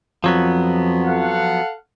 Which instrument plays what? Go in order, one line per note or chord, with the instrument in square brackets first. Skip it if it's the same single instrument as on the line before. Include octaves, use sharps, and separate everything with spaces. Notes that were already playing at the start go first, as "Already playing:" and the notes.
[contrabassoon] F2 [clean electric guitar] F3 F#3 B3
[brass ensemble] A4 F5 F#5